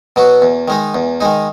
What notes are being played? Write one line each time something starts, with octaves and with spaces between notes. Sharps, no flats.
B2 F#3 B3 F#4
E2
D#3 G#3 D#4
E2
D#3 G#3 D#4